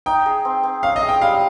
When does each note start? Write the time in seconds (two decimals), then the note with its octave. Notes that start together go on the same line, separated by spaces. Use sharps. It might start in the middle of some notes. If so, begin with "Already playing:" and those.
0.06 D#4 G5
0.26 G#4
0.45 C4
0.63 C4
0.83 C#4 F5
0.96 D#5
1.03 G#4
1.09 G5
1.21 G3 F5